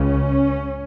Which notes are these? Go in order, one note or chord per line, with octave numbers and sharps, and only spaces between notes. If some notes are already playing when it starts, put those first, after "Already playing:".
Already playing: C#2 C#3 C#4